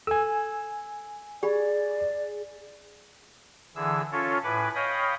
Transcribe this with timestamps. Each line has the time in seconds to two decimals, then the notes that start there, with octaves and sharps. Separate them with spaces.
0.07 A4 G#5 E6
1.43 G4 G#4 D5 B5
3.76 D3 E3 G#4 E6
4.12 C#4 F4 A4 C#5
4.44 A2 B4 G#5 B5 D6
4.75 C#5 D#5 F5 G5 B5 D#6